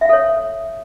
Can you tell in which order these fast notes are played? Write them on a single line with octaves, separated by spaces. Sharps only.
E5 F5 A4 C#5